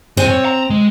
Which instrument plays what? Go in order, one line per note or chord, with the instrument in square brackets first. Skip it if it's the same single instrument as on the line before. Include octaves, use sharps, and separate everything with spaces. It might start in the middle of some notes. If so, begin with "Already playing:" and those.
[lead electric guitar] G2 G#5 [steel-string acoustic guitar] C4
[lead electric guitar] C#5
A#5
G#3